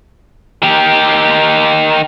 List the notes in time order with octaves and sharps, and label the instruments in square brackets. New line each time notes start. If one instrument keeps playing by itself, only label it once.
[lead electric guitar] D#3 G4